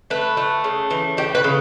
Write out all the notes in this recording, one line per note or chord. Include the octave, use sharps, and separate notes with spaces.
A3 B4
A3
C#3
E3
A3 G4
B4
C#3